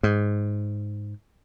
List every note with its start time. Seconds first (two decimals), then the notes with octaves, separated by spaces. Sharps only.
0.03 G#2